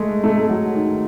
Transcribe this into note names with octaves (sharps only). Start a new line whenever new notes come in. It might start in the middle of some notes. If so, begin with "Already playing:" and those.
Already playing: G#3 A3
A3
A3
F#3
D#3